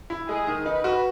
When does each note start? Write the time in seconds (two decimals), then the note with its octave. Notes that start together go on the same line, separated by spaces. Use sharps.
0.10 E4
0.29 G#3 G#4
0.47 D#3
0.66 D#4 B4
0.84 F#4